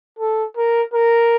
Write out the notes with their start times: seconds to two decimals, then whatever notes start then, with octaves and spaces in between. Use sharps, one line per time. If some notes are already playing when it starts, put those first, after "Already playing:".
0.19 A4
0.57 A#4
0.94 A#4